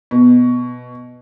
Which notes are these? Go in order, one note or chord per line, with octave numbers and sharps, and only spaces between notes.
B2